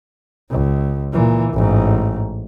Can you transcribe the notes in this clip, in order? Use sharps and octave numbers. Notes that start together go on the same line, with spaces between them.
C#2
A#2 E3
A1 G#2